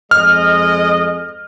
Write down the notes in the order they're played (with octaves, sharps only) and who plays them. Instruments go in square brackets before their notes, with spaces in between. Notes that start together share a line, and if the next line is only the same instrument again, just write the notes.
[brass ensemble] F2 G#3 D#5 [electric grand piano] F6